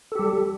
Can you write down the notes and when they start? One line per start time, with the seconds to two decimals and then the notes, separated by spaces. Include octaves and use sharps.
0.12 A4
0.15 G4
0.19 G3